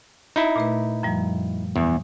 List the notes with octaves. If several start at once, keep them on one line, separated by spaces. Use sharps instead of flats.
D#4 E4
A#2 A3 B4
F#2 F3 G3
E2